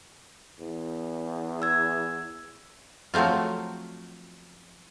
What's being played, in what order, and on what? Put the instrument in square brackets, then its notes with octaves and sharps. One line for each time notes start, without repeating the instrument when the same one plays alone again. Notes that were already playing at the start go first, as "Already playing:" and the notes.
[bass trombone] E2
[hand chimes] E6 G#6
[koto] F3 F#3 A3 C4 F4